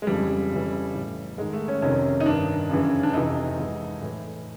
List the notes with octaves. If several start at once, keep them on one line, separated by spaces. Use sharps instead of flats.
G#3
F2 C#3 E3 G3
F2 C#3 E3
A2 E3
G#2 D#3 G#3
A3
C#4
F2 C3 D#3 C#4
D#4
G2 D#3 D4
F#2 C#3 E3
D4
F2 C3 E3 D#4
G#2 E3
A2 E3